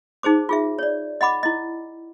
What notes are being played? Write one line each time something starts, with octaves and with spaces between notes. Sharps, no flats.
D#4 G#4 C5 D6
F4 G#4 E5
C#5 D5
D#5 F#5 B5 D6
E4 D#5